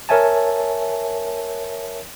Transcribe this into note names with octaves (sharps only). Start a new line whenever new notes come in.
A#4 C#5 E5 G#5 A5